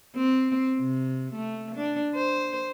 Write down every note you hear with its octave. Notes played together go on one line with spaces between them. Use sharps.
C4
C3
A3
D4
C5